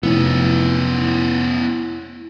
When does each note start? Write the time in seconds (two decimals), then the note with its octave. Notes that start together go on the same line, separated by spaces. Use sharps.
0.03 F1 B3 C#4 E4